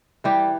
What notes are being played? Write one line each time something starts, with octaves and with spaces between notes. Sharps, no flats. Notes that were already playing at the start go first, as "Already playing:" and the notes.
E3 G3 G4